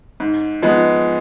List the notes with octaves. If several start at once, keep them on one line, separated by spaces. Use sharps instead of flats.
G#2
F3 G#3 B3